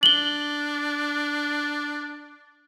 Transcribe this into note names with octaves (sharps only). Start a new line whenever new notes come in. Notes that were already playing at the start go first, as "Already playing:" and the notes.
D4 F#7 G7